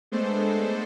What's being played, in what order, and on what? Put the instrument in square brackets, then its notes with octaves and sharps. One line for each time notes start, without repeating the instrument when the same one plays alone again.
[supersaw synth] G#3 A3 B3 D4 A4 C5